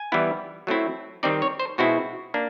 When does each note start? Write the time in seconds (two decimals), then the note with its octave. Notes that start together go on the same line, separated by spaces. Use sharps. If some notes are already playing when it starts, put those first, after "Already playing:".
Already playing: G#5
0.12 E3 G3 B3 E4
0.67 F#3 A3 C4 E4
1.23 D#3 G3 C4 D#4 D5
1.42 C#5
1.60 C5
1.78 B2 G#3 C4 E4 F#4
2.34 A#3 D4